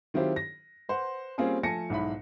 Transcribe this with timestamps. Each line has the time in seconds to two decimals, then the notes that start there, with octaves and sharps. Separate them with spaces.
0.14 D#3 F#3 C4 E4 F4 G4
0.36 A#6
0.89 B4 C5 F#5
1.38 G3 A#3 C4 C#4 F4 G#4
1.63 F3 A3 G#5 A5 A#6 C#7
1.90 B1 G#2 E4 B5